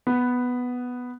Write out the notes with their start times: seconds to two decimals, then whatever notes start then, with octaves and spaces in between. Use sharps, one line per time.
0.07 B3